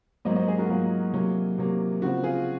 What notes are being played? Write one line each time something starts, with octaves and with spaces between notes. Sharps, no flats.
G#2 F#3 A#3 C5 D#5
C5 D#5
G#4 C5
F#4 A#4
G#2 F#3 A#3 F4 G#4
C3 F#3 A#3
C3 F#3 A#3
C#3 F3 C4 F#4
F4 G#4